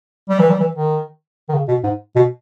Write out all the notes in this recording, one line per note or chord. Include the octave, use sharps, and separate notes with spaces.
G3
E3
G3
E3
D#3
D#3
C#3
B2
G#2
B2